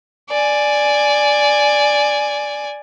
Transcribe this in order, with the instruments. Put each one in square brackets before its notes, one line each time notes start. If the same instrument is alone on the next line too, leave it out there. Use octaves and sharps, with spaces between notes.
[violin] D5 G#5